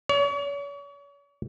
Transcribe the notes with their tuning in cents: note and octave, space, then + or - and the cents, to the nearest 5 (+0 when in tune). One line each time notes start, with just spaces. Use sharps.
C#5 +40